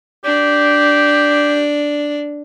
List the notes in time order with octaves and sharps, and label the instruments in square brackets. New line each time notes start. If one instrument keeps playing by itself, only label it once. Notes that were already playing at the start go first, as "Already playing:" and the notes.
[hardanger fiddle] D4 [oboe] G4